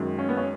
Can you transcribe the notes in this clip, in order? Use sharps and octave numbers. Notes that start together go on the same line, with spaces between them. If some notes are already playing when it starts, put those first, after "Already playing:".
Already playing: F#2 D#3 G#3
C#4
B3
C#4